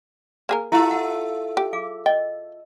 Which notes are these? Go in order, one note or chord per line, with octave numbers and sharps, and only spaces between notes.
A#3 G#4 A#4
E4 F4 G4 A4 E5
F#5
G4
G#4 F5 D6
D#5 G5